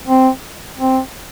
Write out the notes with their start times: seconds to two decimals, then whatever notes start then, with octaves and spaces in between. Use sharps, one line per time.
0.07 C4
0.79 C4